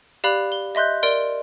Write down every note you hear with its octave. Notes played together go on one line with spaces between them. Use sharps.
G4 D5 F5 B5 F#6 F7
G7
D#5 E5 C6 F#6 G6
A#4 D5 C6 D7